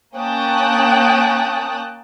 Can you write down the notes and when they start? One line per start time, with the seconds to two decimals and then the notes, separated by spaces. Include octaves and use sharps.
0.15 A#3 C#4 G5 A5 D#6 F#6